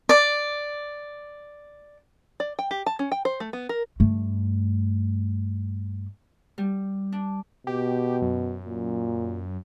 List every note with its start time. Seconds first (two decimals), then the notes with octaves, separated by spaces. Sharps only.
0.09 D5 D6
2.40 D5
2.59 G5
2.71 G4
2.86 A5
2.99 C#4
3.12 G5
3.25 C5
3.40 A3
3.53 B3
3.69 A#4
4.00 G2 A3
6.58 G3
7.12 D4
7.67 B2 G4
8.22 F#2
8.66 A#2